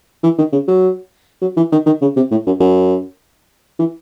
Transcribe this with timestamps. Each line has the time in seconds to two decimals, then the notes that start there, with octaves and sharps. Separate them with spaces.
0.24 E3
0.38 D#3
0.53 C#3
0.68 F#3
1.41 F#3
1.57 E3
1.72 D#3
1.86 D#3
2.02 C#3
2.16 C3
2.31 A2
2.46 F#2
2.60 F#2
3.79 E3